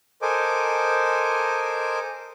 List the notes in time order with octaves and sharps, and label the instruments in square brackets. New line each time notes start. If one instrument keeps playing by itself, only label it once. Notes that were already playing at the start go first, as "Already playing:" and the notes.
[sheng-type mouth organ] A4 A#4 C5 D#5 G#5 D6